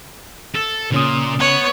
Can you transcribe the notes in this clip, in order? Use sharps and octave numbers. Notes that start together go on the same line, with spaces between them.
A4
A#2 C#3 C#4 D#6
B3 C#5